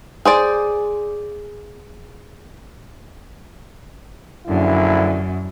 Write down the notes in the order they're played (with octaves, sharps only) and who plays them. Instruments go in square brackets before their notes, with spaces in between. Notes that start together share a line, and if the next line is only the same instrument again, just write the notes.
[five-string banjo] G#4 C5 D5
[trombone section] A#1 D3 E4 [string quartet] F#2